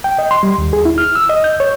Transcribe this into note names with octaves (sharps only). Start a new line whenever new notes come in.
G5
D#5
C6
G3
D#2
G#4
E4
F6
E6
D#5
G6
C#5